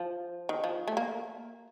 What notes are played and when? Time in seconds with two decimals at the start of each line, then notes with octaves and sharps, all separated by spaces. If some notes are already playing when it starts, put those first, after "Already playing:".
Already playing: F3
0.49 D#3
0.64 F3
0.88 A3
0.97 A#3